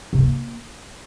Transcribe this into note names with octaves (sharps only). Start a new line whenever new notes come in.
C3
D#3
A#3